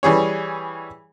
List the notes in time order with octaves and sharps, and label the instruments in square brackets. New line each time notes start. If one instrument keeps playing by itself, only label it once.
[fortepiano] E3 G3 G#4 C#5